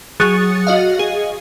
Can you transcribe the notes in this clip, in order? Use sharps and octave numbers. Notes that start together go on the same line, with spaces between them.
F#3 G#4 D#6 F#6 A6 C#7
F#4 D#5 F5
G#4